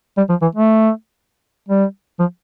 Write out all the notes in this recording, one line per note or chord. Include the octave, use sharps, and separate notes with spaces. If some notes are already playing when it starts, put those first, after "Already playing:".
G3
F3
E3
A3
G3
F3